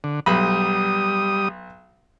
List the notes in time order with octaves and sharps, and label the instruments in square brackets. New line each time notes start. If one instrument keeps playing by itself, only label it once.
[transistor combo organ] D3
[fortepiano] B1 B5 [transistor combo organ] G3 D#6